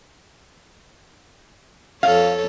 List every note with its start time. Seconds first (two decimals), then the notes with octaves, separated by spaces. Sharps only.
2.03 F2 A4 C#5 F5